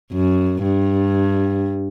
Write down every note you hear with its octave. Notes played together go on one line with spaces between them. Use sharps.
F#2
G2